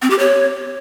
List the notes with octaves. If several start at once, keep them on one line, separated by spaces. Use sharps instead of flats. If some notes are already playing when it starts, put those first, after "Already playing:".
C4
G4
C#5